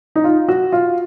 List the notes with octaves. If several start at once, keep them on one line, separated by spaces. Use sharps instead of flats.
D#4
F4
F#4
F4